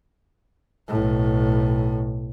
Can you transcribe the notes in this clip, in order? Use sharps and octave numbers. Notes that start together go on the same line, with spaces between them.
B1 A2